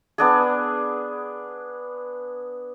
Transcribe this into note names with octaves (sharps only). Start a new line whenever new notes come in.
B3 D4 G#4